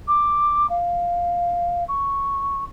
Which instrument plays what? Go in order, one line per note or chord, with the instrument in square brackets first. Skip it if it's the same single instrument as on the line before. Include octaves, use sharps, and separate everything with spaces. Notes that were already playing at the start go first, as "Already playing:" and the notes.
[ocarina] D6
F5
C#6